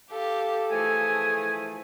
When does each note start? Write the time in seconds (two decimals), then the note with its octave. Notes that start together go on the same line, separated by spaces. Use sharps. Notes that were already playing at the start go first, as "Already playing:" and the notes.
0.11 G4 A4 F5
0.71 E3 F3 A3 G#4 G#5